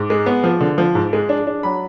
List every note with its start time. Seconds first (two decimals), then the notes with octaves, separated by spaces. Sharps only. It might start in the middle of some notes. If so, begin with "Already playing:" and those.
Already playing: G#2 D6
0.10 G#3
0.26 B3
0.44 F3
0.61 D3
0.78 F3
0.95 G#2
1.13 G#3
1.29 D4
1.47 D4
1.63 F#3 B5